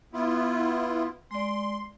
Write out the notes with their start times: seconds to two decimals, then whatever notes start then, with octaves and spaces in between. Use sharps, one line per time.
0.13 B3 E4 F4
1.31 G#3 D5 C6